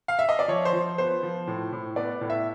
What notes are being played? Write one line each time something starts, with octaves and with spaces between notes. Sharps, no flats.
F5
E5
D#5
D5
F3 C#5
C5
F3
B3 C5
F3
A2
A2
B3 D5
A2
E5